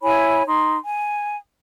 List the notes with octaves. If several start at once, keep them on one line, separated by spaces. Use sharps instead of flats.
E4 C#5 G#5 B5
D#4 C6
G#5